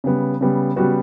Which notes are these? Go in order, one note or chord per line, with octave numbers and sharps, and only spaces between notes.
C#3 G3 B3
C#3 G3 B3
C#3 G3 B3 F#4